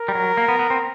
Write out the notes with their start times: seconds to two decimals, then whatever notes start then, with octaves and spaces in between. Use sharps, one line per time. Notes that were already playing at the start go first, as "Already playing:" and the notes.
Already playing: A#4
0.08 G3
0.15 F#3
0.37 A#3
0.48 B3
0.59 B3
0.70 C4